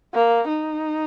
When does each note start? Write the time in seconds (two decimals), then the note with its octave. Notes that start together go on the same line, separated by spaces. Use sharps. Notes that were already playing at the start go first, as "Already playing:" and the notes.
0.14 A#3
0.48 D#4